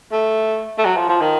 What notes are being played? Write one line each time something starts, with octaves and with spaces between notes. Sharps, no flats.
A3
A3
F#3
F3
F3
D#3